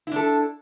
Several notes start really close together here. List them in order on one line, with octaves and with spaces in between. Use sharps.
E4 D4 A4